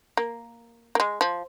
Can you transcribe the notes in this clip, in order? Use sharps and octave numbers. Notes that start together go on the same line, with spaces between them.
A#3
A#3
G#3
F3